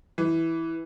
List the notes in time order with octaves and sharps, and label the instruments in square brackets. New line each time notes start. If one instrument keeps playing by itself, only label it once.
[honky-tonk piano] E3